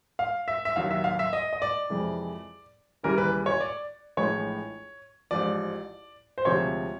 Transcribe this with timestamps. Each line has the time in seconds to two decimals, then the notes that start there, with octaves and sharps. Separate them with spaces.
0.19 F5
0.48 E5
0.65 E5
0.76 D#2 D#3 F#3 F5
0.91 E5
1.04 F5
1.19 E5
1.33 D#5
1.53 D#5
1.62 D5
1.90 F2 C3 E3 G#3
3.03 D#2 C#3 E3 G3 A#4
3.18 B4
3.46 C#5
3.61 D5
4.17 A#1 A2 E3 G#3 C#5
5.31 A1 G#2 F3 D5
6.38 C5
6.45 D2 C3 F3 G#3 C#5